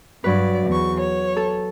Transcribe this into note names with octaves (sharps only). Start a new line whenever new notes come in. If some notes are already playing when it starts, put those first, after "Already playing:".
G2 F#3 B4 D5
E2 C#6
C#5
A4